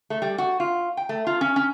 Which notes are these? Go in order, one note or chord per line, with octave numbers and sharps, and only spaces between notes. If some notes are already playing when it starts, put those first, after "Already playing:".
A3
G3
F#4
F4
G5
A3
F4
C#4
C#4